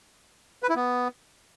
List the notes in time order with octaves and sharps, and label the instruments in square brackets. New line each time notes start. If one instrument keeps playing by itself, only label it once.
[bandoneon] B4
E4
B3